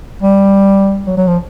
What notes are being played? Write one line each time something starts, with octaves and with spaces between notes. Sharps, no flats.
G3
F#3
F#3
F3